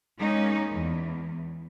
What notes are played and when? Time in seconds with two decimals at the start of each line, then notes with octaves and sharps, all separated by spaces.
0.19 G#3 A#3 C#4 D#4
0.70 E2